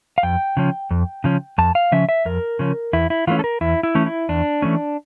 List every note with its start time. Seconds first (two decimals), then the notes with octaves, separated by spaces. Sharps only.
0.18 F5
0.23 F2 G5
0.57 C#3 F3 C#4
0.91 F2
1.24 C#3 F3 C#4
1.58 F2 A5
1.75 F5
1.92 C#3 F3 C#4 E5
2.09 E5
2.25 F2 A#4
2.59 C#3 F3 C#4
2.93 E2 E4
3.10 E4
3.27 E3 A3 C#4 F4
3.39 A4
3.44 A#4
3.61 E2 E4
3.83 E4
3.95 E3 A3 C#4
4.06 E4
4.29 E2 D4
4.62 E3 A3 C#4